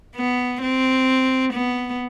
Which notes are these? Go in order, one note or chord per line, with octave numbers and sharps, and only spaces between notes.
B3
C4
B3